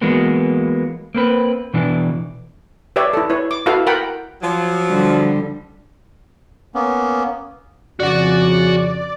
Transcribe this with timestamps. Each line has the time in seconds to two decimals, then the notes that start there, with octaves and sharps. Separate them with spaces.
0.01 E3 F#3 G#3 A#3 B3
1.15 A#3 C4 B4
1.73 B2 E3 D4 E4
2.96 G4 B4 C#5 D5 E5
3.13 E4 A4
3.29 E4 B4 C#5
3.51 D6
3.66 E4 F#4 A4 B4 E5 F5
3.87 A#4 F#5 G5 B5
4.42 F3 F#3
4.89 D3 G3
6.75 A#3 B3 C#4
8.00 F2 C#3 F#4 D5 F#5